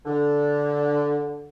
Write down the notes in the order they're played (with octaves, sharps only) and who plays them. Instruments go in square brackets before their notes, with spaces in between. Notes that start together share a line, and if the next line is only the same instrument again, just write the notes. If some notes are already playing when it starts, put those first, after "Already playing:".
[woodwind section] D3